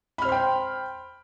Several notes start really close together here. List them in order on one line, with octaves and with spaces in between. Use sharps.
B5 F6 C5 C6 G5